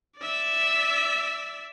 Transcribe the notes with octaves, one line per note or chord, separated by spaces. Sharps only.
D5 E5